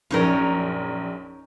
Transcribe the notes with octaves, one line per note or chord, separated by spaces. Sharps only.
A#1 F#2 C#4 D#4 A#4